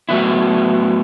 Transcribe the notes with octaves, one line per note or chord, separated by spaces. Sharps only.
A2 F#3 B3 E4